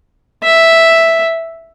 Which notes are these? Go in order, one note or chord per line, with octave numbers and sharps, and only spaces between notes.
E5